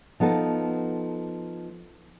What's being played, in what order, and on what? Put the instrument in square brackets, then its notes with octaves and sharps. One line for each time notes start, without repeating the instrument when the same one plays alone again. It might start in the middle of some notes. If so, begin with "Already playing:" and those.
[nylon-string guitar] F3 B3 D#4 A4